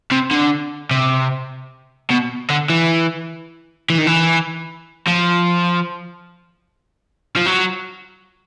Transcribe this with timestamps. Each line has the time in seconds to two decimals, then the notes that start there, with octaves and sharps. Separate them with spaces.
0.12 C3
0.31 D3
0.91 C3
2.11 B2
2.50 D3
2.70 E3
3.90 E3
3.98 D#3
4.07 E3
5.08 F3
7.36 F3
7.46 F#3